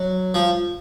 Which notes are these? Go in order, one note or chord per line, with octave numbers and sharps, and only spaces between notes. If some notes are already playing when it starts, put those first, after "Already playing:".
Already playing: F#3
F3